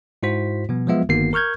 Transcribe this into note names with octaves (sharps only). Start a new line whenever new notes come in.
G#2 E4 F#4 C5 B6
B2 F3 G3 B3
F3 F#3 G#3 B3 F4 E5
G1 D#3 A#3 B3 F#4 C7
A#4 C#6 F6 G6 G#6